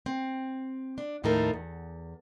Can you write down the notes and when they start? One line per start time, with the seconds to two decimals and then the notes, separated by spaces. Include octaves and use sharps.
0.06 C4
0.98 D4
1.24 D#2 A2 F3 D#4 A4 A#4
1.54 E2